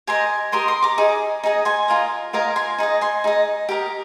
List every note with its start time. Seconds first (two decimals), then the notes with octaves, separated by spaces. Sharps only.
0.07 G4 A#4 D#5 G#5 C6
0.52 G4 A#4 D#5 C6 D#6
0.68 C6 D#6
0.82 A#5 D6
0.98 D#4 G#4
1.43 D#4 G#4 D#5
1.65 G#5 C6
1.88 F4 A#4 D#5
2.33 F4 A#4 D#5 F5 G#5
2.56 G#5 C6
2.78 D#4 G#4 D#5
3.01 G#5 C6
3.24 D#4 G#4 D#5
3.69 G4 A#4 D#5